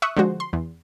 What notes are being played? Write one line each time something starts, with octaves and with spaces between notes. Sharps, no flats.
E5 C#6 D#6 F#6
D3 F3 G#3 F#4 C5
C6
E2